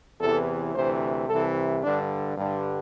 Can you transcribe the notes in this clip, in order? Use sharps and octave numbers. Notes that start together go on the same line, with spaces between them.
E2 C3 E3 A4
D2 C3 E3 C5
C2 C3 E3 A4
G2 D3 D4
G2 D3